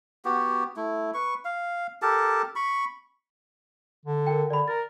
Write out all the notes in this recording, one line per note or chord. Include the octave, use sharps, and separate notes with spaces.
B3 F#4 G4
A3 E4
B4 C#6
F5
G4 A4 A#4 A5
B5 C#6
D3
A#4 G5
D3 D5 B5
A#4 A6